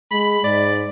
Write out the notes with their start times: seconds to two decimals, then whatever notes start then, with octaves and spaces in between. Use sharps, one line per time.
0.11 G#3 B5
0.44 G#2 D5